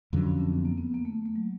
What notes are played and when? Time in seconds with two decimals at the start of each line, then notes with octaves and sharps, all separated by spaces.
0.13 F2 D3 F#3 C#4
0.27 C#4
0.40 C4
0.53 B3
0.65 A#3
0.78 B3
0.94 A#3
1.05 A3
1.25 A3
1.36 F#3